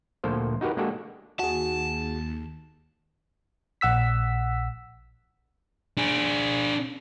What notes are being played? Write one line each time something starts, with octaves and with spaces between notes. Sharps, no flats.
D2 A#2 F3 A#3 A4 C5
D#4 F#4 G4 A#4 B4
G#3 A#3 D4 F#4 G4 A4
D#2 F#4 G#4 A5
A#1 F#5 E6 B6
D4 G#4